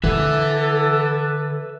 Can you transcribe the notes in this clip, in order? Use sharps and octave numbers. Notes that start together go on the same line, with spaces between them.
D3 A4 B4 E5 F#5 D6 E6